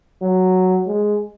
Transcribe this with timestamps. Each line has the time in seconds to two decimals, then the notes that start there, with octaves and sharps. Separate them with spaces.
0.22 F#3
0.87 G#3